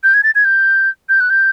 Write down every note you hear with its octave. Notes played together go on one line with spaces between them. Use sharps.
G6
G#6
A6
G#6
G6
G6
F#6
G6